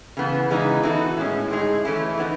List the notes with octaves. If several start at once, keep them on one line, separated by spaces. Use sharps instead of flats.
C#3 E3 B3
C#3 E3 G#3 B3 D#4
E3 B3 D#4 F#4 A4
A2 G#3 C#4
A2 G#3 D#4 G#4
E3 A3 C#4 E4
E3 B3 D#4